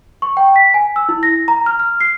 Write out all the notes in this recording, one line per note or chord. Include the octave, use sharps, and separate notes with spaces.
C#6
G5
B6
G#5
E6
E4
A#6
A#5
F6
F6
C7